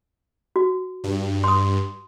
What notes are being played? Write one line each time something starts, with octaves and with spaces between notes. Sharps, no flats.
F#4
G2
C6 D#6